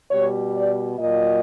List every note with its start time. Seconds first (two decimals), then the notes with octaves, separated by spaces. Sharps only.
0.11 B2 G3 C#5
0.55 D5
0.99 A#2 F#3 D#5